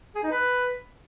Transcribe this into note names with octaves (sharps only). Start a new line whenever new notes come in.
G#4
D#4
B4